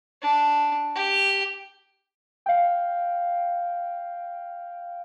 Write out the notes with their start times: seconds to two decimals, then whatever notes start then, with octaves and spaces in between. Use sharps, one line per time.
0.22 D4
0.95 G4
2.46 F5 G5